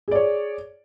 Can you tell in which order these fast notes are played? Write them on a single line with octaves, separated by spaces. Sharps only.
G#4 D5 C#5